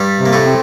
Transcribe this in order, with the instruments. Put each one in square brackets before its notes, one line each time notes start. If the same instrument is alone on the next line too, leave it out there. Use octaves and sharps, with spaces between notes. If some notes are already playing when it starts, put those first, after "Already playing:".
Already playing: [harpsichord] G2 G3
[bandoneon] C3
[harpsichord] A#3
A2 A3
[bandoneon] C4